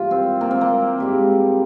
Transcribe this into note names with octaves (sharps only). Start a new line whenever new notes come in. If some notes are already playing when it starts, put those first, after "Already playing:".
Already playing: G2 E3 A#3 F4
C4
A#3
C4
A#3
G#2 G3 A#3